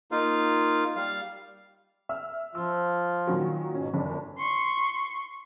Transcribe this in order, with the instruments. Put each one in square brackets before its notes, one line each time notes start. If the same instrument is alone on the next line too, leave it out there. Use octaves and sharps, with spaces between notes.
[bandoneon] A#3 D#4 F4 F5
G3 F5
[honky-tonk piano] E5 E6 F6
[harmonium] F3 F4 [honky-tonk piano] E6
[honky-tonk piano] A#2 D#3 F#3
[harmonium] G#2 B2 [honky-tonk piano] C#4
[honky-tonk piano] G1 D4 [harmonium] F#2
[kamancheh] C6 C#6